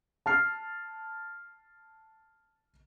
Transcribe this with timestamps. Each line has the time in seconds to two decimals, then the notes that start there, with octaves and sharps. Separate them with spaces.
0.26 A5 F6 C7